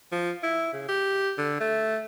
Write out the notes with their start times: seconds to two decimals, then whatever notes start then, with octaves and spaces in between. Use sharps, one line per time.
0.12 F3
0.43 E4
0.73 C#3
0.88 G4
1.38 D3
1.60 A3